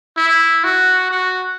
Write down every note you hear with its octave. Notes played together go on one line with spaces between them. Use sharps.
E4
F#4
F#4